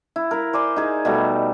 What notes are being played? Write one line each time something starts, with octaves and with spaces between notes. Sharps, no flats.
E4
E4 A#4
C5 D5 G#5 C6
D#4 G#4
B2 G3 A3